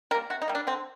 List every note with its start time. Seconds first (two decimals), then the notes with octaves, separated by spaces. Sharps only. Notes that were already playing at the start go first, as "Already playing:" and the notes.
0.11 G3 A#3 A#4
0.30 C3 F#4
0.42 D#4
0.48 G3 A#3
0.55 D4
0.67 D3 C4